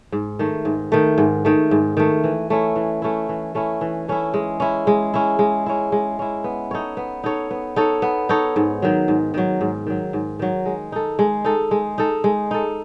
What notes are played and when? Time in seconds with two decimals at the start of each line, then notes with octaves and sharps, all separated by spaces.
0.12 G#2
0.39 D#3 A3
0.65 G#2
0.92 D#3 A3
1.18 G#2
1.45 D#3 A3
1.71 G#2
1.97 D#3 A3
2.24 E3
2.50 A3 C#4 E4
2.76 E3
3.02 A3 C#4 E4
3.29 E3
3.55 A3 C#4 E4
3.81 E3
4.08 A3 C#4 E4
4.34 G#3
4.60 C#4 E4
4.87 G#3
5.14 C#4 E4
5.39 G#3
5.66 C#4 E4
5.92 G#3
6.19 C#4 E4
6.44 B3
6.71 D#4 A4 C#5
6.97 B3
7.24 D#4 A4 C#5
7.51 B3
7.76 D#4 A4 C#5
8.02 B3
8.29 D#4 A4 C#5
8.56 G#2
8.82 D#3 F#3
9.08 G#2
9.34 D#3 F#3
9.61 G#2
9.87 D#3 F#3
10.13 G#2
10.39 D#3 F#3
10.66 G#3
10.92 D#4 A4
11.19 G#3
11.45 D#4 A4
11.71 G#3
11.98 D#4 A4
12.24 G#3
12.51 D#4 A4